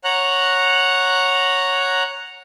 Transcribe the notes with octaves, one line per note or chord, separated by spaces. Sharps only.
C#5 F#5 A#5 F#6